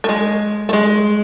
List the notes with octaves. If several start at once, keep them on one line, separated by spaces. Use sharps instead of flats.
A3
G#3
A3
G#3